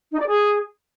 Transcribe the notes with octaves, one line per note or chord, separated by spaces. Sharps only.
D#4
D5
G#4